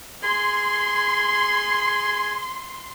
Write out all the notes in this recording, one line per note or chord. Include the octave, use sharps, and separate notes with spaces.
G#4 C6